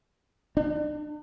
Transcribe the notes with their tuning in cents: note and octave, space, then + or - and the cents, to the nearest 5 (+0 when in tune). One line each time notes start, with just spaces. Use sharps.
D4 +40